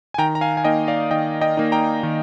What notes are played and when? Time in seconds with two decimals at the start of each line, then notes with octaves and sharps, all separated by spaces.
0.14 G#5
0.18 D#3 G5 A#5
0.35 A#5
0.41 F5 G#5
0.57 G#5
0.64 A#3 D#4 D#5 G5
0.88 D5 F5
1.11 D#3 D#5 G5
1.41 D#5 G5
1.57 A#3 D#4
1.72 G5 A#5
2.03 D#3